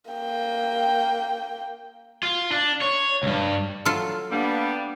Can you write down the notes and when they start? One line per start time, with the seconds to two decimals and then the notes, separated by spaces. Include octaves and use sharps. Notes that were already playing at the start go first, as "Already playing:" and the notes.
0.11 A#3 G5
2.23 F4
2.52 D4
2.82 C#5
3.23 C#2 G2
3.85 F#3 F4 A4
4.32 G3 A#3 B3 D4